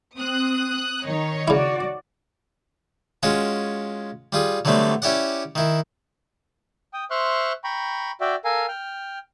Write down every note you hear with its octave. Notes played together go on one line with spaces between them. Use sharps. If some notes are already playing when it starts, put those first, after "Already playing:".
C4 D#6 F#6
D#3 D#4 C#5
C#3 E4 F#4 D5
G#3 C#4 F4 F#4
G3 F4 G#4
D3 F#3 G3 A3 B3 C4
C#4 E4 G4 D5 F#5
D#3 E4
G5 D#6
C5 E5 C6 C#6 F6 F#6
G5 A#5 B5 C#6
F#4 D5 E5 G5
A4 A#4 F5 G#5
G5 F6